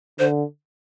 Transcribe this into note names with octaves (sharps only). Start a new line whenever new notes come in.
D3 C5